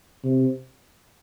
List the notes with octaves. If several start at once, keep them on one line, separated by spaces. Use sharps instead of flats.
C3